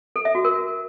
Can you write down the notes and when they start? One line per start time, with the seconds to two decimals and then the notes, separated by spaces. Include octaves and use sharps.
0.16 A4
0.25 E5
0.35 F#4
0.44 A#4